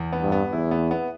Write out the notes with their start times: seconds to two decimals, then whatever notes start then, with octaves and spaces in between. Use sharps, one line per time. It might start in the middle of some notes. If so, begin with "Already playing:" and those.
Already playing: E2
0.13 B3
0.22 G2
0.32 B3
0.52 E2 E4
0.71 B3
0.91 B3